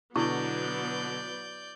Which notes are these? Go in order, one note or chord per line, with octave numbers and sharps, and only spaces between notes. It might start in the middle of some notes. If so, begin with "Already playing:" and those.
B2 D3 F#3 B3 E4 D5 C#6 G6